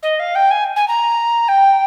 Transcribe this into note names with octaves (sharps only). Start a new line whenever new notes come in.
D#5
F5
G5
G#5
G#5
A#5
G5